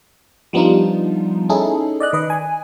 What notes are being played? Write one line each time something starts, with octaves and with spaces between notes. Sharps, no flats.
F3 G3 B3 D4 D#4 F4
C#4 D#4 E4 G#4 A4
D5 D#5 F#6
D#3 B4 D#5
G#5